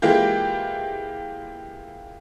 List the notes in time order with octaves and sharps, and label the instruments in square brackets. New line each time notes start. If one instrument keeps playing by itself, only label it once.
[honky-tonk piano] E3 G#3 A#3 F4 G4